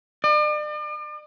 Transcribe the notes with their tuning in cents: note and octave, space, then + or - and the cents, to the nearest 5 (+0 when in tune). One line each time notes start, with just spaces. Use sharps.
D5 +40